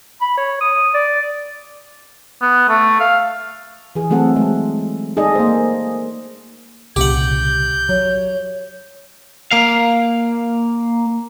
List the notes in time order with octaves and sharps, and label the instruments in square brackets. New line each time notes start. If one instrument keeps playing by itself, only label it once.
[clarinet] B5
C#5
D#6
D5
[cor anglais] B3
A3
F5
[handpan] E3 G#4
F#3 A3 C4 A4 F#5
G#3
D#4 G#4 A4 D5 D#5
A#3 C5
[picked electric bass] C2 A#2 C#3 [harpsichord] G4 F#5 [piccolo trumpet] G6
[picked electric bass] F#3 [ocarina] C#5
[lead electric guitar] A#3 F5